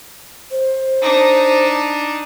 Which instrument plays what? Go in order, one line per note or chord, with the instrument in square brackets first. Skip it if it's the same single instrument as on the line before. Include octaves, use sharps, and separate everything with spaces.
[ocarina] C5
[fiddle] D4 D#4